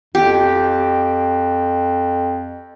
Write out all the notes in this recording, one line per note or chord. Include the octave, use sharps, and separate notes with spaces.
F2 G4